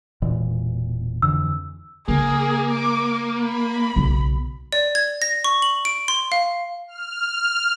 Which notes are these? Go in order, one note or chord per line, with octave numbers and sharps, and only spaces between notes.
E1 A#2 E3
F2 D3 E3 E6
C#3 A#3 G#4
D6
B5
B1 C#3
D5
G#6
A#6
C#6
F#7
D7
C6
F5
F6